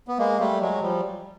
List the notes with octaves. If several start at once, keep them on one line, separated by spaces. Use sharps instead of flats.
B3
G#3 A#3
G3 A3
F#3 G#3
F3 G3